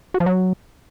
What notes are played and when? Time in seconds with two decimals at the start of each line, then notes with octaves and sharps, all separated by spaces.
0.14 F#4
0.20 F3
0.26 F#3